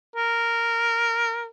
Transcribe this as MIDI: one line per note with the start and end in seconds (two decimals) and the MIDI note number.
0.16 1.48 70